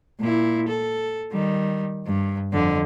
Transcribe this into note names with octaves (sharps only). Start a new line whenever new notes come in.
A#2 E4
A4
D#3 G3
G2
F2 D3